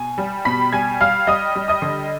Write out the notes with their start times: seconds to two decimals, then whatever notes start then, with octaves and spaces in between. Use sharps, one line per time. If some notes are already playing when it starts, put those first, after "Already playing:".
Already playing: B2 G#5
0.18 G3
0.45 B2 B5 B6
0.73 G3 G#5 G#6
1.01 G3 F5 F6
1.27 G3 D#5 D#6
1.55 G3
1.68 D#5 D#6
1.82 D3